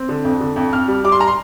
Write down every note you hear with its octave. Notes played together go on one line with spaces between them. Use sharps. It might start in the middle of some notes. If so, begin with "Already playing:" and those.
Already playing: C4
D3
F2
D3
F2
F2 F6
G3
G3 D6
C6
A#5
C6